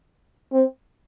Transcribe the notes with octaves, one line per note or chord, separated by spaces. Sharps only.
C4